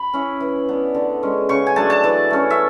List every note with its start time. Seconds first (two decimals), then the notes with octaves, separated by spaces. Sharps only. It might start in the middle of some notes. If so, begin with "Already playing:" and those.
Already playing: B5
0.14 C#4 E4
0.40 E3
0.69 B3 D4
0.95 D3
1.23 G#3 C#4
1.49 C#3 C#6
1.67 G#5
1.76 F#3 A3 D4 A5
1.90 A5
2.04 E3
2.31 A3 C#4
2.50 E5